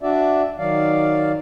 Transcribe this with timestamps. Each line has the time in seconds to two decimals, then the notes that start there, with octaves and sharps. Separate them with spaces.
0.01 D4 F#4 D5 E5
0.58 D#3 F#3 D5 F5